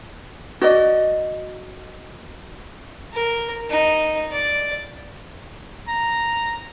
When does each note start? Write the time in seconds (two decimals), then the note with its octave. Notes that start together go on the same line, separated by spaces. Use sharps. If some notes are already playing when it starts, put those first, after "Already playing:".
0.62 F#4 D5 D#5
3.13 A#4
3.70 D#4
4.31 D5
5.88 A#5